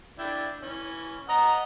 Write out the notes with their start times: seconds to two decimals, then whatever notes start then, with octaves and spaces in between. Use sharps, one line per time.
0.19 D4 E4 G5
0.63 E3 C#4
1.29 D#5 F#5 A#5 D#6